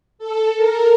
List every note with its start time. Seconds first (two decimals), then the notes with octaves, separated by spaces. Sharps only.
0.19 A4
0.56 A#4